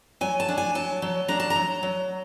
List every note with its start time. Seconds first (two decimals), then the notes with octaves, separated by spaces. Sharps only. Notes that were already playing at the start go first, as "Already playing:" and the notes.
0.21 F#3 G#5
0.40 A5
0.49 D4
0.58 G#5
0.75 F#3 A5
1.02 F#3
1.28 D4 A#5
1.40 A5
1.50 A#5
1.55 F#3
1.83 F#3